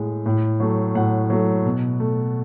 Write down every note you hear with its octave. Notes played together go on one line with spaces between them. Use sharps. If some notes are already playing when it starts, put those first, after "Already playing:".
Already playing: A2 G#3
A2
F#3 A3
A2 F#5
F#3 A3
B2
A3